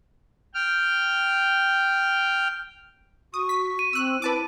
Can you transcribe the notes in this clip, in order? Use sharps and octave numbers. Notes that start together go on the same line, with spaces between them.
G5 F6
F#4 C#6 D#6
B6
D#7
C4 E6 F#6
E4 B4 A5 D6